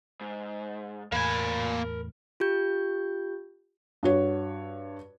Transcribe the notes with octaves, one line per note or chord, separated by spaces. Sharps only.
G#2
E2 A2 A#3 A#4 G#5 B5
F4 G4 G6
G2 F#4 C#5